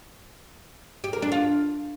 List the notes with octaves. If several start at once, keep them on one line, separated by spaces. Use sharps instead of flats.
G4
A#4
D4
F4